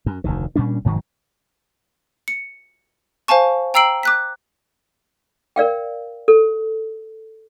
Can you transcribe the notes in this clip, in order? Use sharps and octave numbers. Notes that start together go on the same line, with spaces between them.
F#2
F1 D2 D#3
A#2 G3 C#4 D4
F1 G#2 D#3 F#3
C#7
C5 F5 G#5 A5 C#6
G5 A#5 E6 C7 D7 F#7
D6 F#6 B6
A#4 D5 F5 G5
A4